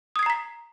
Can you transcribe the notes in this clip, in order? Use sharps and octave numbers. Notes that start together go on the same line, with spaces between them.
A#5 D#6 G#6 B6 C7